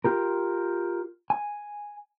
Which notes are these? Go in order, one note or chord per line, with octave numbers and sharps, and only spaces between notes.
F4 G4 A#4
G#5